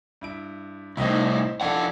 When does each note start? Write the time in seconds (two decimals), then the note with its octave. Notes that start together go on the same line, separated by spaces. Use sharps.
0.21 G2 E4 D7
0.97 C2 A2 C4 D#4 E4
1.61 F2 D4 E4 A4 F#5